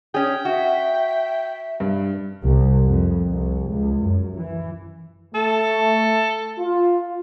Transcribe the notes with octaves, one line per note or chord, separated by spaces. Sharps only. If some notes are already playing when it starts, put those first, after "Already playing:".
C#4 G#4 G5
F#4 E5
G2
C2
F2
C2
C#2
F#2
E3
A3 A4
F4